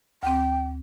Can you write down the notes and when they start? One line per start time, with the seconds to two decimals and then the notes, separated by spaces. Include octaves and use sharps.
0.23 D2 C4 G5